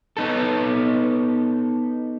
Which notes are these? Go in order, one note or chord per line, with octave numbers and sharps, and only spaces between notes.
B3 D#4 A4